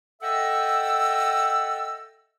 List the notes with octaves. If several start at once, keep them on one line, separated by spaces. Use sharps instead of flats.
A4 D#5 E5 F#5 G5 E6